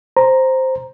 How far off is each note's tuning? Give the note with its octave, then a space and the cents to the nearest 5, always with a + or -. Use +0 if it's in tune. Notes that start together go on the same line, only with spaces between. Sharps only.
C5 +0 A#5 +0